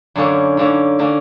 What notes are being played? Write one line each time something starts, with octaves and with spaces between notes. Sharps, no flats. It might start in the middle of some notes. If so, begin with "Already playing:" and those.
F#2 D3 A#3 C#4
F#2 D3 A#3 C#4
D3 A#3 C#4